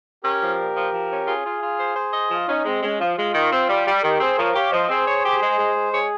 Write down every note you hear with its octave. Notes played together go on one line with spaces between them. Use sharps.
C#4 G4 A#4
F3
A#2
F3
F3
C#4
F4 G#4
F4
F4
C5
C5
D#5
F3 F4
C#4 D#4
G#3 C4
G#3 C#4
F3 F4
G#3 F4
D#3
C4
G3
G3 G4
D#3 G4 A#4
C4 G#4 C5
F3 A#4 C#5
G4 C#5 F5
F3 C5 D#5
C4 G#4 C5
C#5
G4
G#3
G#3
G#3
G#4 C#5